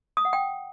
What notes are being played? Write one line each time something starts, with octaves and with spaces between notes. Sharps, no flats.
D#6
F#5
G5